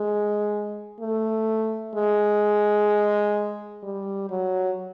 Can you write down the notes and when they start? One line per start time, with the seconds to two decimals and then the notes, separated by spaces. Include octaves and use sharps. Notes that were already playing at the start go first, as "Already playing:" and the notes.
Already playing: G#3
1.00 A3
1.95 G#3
3.83 G3
4.30 F#3